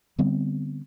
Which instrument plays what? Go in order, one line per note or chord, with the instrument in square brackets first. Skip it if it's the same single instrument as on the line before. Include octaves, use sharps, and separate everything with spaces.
[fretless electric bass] D3 G3 B3 C4